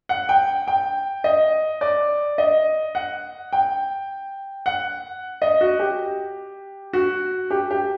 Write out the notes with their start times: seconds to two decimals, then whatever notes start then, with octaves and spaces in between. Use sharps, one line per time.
0.09 F#5
0.29 G5
0.68 G5
1.24 D#5
1.81 D5
2.38 D#5
2.95 F#5
3.53 G5
4.66 F#5
5.42 D#5
5.61 F#4
5.79 G4
6.93 F#4
7.50 G4
7.71 G4